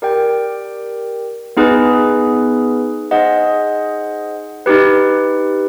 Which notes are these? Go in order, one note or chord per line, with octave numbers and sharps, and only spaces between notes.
G4 A#4 D5 G5
B3 D#4 G#4 B4
D#4 G#4 C5 D#5 F#5
D#4 G4 B4